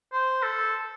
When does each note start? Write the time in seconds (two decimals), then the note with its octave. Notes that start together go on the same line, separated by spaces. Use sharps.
0.13 C5
0.43 A4